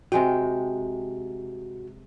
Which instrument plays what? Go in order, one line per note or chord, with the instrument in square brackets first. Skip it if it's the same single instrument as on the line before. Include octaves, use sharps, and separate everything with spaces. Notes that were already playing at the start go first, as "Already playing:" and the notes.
[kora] C3 G#3 G5 [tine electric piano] F#4